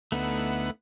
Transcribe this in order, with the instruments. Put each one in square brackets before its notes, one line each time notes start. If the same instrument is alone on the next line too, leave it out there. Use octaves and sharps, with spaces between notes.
[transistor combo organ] D2 B3 F#5 [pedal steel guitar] A3 D#4 E4